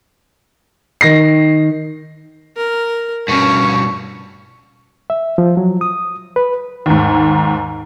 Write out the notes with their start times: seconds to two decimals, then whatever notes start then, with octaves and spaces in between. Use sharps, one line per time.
1.01 D#3 A#6 C7
2.56 A#4
3.28 G2 B2 C#4 C#6
5.10 E5
5.38 F3
5.57 F#3
5.81 D#6
6.36 B4
6.86 D#2 G#2